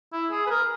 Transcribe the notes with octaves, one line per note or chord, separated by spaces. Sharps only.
E4
G#4
B4
A#4